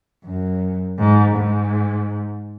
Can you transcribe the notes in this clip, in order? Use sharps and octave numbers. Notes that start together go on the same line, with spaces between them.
F#2
G#2
G#2